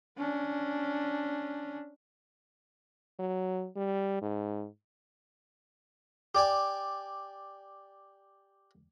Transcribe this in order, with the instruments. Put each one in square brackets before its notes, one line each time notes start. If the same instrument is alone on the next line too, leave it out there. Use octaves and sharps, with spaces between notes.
[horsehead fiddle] C#4 D4
[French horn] F#3
G3
G#2
[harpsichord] G4 D5 G#5